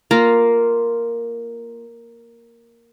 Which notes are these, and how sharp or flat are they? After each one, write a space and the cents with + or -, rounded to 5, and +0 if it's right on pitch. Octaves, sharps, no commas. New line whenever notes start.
A#3 +0 F4 +0 A#5 +0